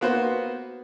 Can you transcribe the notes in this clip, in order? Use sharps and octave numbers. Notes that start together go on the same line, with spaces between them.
A#3 B3 F#4 B4 C5